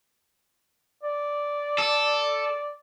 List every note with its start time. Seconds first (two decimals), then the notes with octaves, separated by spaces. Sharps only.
1.03 D5
1.78 A4